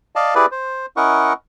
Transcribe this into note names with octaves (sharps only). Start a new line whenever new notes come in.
D5 D#5 F5 A5
E4 G4 G#4 B4 D5
C5
C#4 E4 A#4 D#5 F#5 C#6